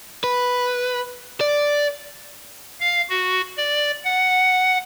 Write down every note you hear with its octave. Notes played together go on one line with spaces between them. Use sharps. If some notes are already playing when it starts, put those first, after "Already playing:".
B4
D5
F5
F#4
D5
F#5